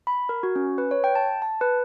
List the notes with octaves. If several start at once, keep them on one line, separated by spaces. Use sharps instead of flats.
B5
A#4
F#4
C#4
B4
C#5
G5
A5
A5
B4